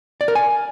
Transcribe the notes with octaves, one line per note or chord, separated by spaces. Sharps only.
D5
A#4
G#5